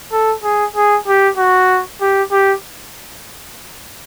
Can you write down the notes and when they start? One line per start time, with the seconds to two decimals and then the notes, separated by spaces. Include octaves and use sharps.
0.12 A4
0.43 G#4
0.76 G#4
1.07 G4
1.38 F#4
2.01 G4
2.31 G4